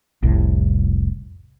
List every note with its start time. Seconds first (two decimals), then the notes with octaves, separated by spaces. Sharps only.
0.23 F1 C2 A2